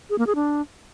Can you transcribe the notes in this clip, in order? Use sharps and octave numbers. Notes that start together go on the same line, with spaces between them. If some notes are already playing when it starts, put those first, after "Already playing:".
G#4
A#3
G#4
D4